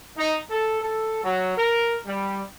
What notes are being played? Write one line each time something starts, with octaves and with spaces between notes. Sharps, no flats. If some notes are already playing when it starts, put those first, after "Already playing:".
D#4
A4
A4
F#3
A#4
G3